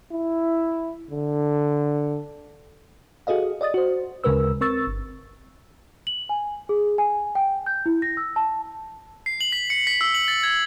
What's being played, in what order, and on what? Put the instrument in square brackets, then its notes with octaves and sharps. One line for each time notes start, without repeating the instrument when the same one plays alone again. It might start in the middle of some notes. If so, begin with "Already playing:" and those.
[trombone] E4
D3
[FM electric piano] F#4 G#4 A4 D#5 F5
D5 D#5 D#6 A6
F#4 C5
D2 C#3 G#3 A#4 B4 E6
C4 A#4 C#6 E6 A6
G1
[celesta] F#7
G#5
G#4
G#5
G5
G6
E4
A#6
E6
A5
[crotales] C7
F#7
B6
C#7
B6
E6
F#7
A6
G#6